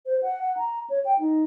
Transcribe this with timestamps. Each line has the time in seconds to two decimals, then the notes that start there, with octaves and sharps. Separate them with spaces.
0.06 C5
0.23 F#5
0.42 F#5
0.57 A#5
0.90 C#5
1.05 G5
1.19 D#4